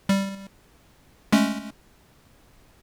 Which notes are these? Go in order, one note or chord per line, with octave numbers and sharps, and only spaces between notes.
G3
G#3 A3 C#4